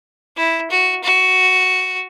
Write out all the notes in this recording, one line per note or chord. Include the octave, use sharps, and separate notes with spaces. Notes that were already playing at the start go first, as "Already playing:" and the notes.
E4
F#4
F#4